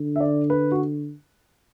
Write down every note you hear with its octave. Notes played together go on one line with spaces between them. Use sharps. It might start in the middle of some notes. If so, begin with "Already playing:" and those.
Already playing: D3
E5
D5
B4
F#4